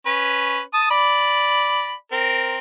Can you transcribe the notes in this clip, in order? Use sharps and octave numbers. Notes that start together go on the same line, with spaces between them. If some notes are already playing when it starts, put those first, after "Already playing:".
C#4 B4
A5 D#6
D5 B5
C4 A#4